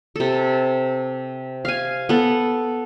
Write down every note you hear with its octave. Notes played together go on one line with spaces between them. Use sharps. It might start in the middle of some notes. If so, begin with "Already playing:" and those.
C3 A4
F5 G#5
B3 A4